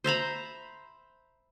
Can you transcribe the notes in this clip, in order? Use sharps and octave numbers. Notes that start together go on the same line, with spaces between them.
C5 E5 A#5 B5